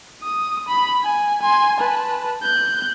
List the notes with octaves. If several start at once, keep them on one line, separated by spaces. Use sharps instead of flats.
D#6
B5
G#5
G#5 C6
B4 A5
F#6 G6